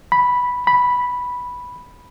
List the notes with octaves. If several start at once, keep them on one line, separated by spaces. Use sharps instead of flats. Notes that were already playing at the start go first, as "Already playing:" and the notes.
B5
B5